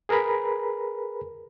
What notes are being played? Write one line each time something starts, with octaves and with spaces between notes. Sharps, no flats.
G#4 A#4 B4 A#5 B5